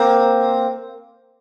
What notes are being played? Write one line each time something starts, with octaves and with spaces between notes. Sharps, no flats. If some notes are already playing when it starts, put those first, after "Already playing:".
Already playing: A#3 C4